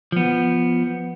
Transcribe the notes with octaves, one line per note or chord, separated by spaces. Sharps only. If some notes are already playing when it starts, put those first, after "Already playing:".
F3 B3